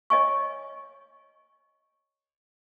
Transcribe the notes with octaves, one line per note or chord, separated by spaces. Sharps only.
C#5 D#5 G#5 C#6